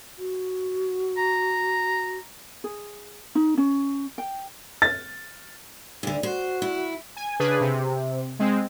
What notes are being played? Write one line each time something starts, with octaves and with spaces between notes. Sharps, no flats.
F#4
A#5
G#4
D#4
C#4
G5
A6
D2 D3
F#4 C5
E4
G#5
C#3 D4 G#4 B4
C3
G#3 C4